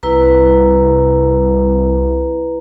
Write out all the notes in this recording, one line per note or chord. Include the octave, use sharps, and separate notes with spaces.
C2 E4 B4 A#5